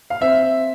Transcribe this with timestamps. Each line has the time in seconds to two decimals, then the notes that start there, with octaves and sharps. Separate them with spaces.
0.10 F5
0.21 C4 E5